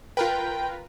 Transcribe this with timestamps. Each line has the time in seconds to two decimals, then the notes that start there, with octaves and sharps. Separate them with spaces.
0.17 F4 A#4 B4 G5